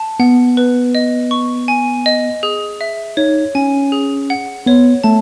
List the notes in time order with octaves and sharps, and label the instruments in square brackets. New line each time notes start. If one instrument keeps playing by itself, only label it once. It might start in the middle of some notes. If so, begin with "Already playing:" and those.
Already playing: [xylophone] A5
[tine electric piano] B3 [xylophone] F#5
[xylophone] B4
D#5
C#6
G#5
D#5
G#4
E5
[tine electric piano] D#4 [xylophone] C#5
[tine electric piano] C#4 [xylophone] G#5
[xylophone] G#4
F#5
[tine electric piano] B3 [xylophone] C#5
[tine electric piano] A3 [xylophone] A5